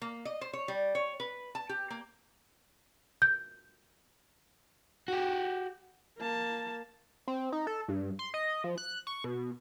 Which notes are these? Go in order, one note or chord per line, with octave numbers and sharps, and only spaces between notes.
A#3
D#5
C5
C#5
G3
C#5
B4
A5
G4
A#3
G6
F#4 G4
A#3 A5
C4
D#4
A4
G2
C6
D#5
F3
F#6
C#6
B2